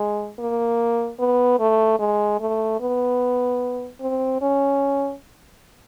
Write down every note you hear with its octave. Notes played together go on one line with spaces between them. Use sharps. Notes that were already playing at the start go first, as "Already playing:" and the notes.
Already playing: G#3
A#3
B3
A3
G#3
A3
B3
C4
C#4